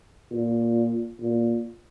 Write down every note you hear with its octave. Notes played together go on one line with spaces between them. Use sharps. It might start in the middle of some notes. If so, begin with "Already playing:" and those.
A#2
A#2